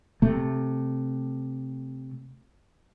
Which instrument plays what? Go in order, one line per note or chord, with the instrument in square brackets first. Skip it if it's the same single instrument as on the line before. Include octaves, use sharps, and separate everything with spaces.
[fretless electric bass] C3 A3